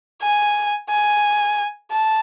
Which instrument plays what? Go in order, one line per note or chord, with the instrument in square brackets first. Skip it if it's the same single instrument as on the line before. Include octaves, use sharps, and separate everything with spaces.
[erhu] G#5
G#5
A5